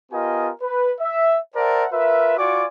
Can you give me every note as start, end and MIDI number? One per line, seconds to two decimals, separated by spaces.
0.12 0.51 59
0.12 0.51 65
0.12 0.51 67
0.12 0.51 70
0.12 0.51 75
0.12 0.51 80
0.62 0.92 71
1.00 1.37 76
1.55 1.86 70
1.55 1.86 72
1.55 1.86 74
1.55 1.86 76
1.55 1.86 78
1.55 1.86 81
1.92 2.35 65
1.92 2.35 70
1.92 2.35 71
1.92 2.35 76
2.38 2.65 65
2.38 2.65 66
2.38 2.65 74
2.38 2.65 80
2.38 2.65 85
2.38 2.65 86